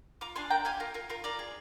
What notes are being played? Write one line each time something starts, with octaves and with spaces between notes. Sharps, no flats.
F4 A#5 D6
D4 G#5 C6
A#3 G5 A#5
G4 F5 G#5
F4 A#4
F4 A#4
F4 A#4
F4 A#4 D5
G#4